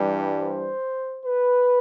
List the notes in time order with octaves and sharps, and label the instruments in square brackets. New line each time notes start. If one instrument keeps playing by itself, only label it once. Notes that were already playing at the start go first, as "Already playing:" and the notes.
Already playing: [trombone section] G2 E3 G3
C5
B4